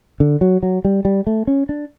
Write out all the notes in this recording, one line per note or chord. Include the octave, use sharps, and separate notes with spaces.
D3
F#3
F#3
G3
G3
A3
C#4
D4